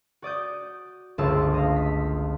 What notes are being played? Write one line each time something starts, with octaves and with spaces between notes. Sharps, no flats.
F#4 D5 D#6 G6
G1 C#2 A3 F4 A5 E6
D#5 F5
B6